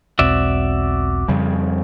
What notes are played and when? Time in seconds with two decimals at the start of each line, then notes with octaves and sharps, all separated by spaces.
0.19 E1 B1 C4 F#4 D5 E5
1.28 F2 C#3 G3